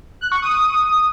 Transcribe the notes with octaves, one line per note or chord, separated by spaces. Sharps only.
F#6
C#6
D#6